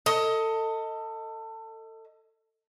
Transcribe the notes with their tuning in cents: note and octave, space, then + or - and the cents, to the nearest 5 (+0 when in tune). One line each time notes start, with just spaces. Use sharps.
A4 +25 D#5 +20